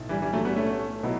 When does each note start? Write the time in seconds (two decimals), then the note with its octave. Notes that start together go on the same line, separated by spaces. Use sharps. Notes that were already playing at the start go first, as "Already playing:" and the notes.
Already playing: B1 A2
0.09 E3 G3
0.22 E3 G3
0.33 F#3 A3
0.45 G3 B3
0.56 A3 C#4
1.03 B2 F#3 B3 E4